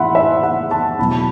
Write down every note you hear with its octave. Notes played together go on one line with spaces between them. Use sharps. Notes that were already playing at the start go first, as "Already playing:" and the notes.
Already playing: A2 E3 E5 F#5 B5 C6
E5
F#5
A5
E2 B2 F#3 B5
A5